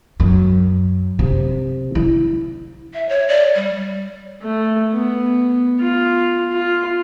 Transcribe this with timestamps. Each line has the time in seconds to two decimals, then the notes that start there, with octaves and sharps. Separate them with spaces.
0.20 F#2
1.19 C3
1.95 E4
2.94 E5
3.09 C#5
3.29 D5
3.56 G3
4.43 A3
4.94 B3
5.81 F4
6.53 F4